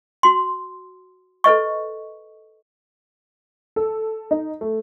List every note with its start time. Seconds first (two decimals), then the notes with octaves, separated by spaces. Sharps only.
0.23 F#4 C6
1.44 A4 B4 D#5 C#6
3.76 A4
4.31 D#4
4.61 A3